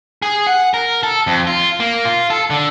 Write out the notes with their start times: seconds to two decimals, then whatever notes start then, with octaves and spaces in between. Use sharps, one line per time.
0.22 G#4
0.47 F#5
0.74 A#4
1.03 A4
1.27 F2
1.47 F4
1.80 A#3
2.05 F4
2.30 A4
2.50 D3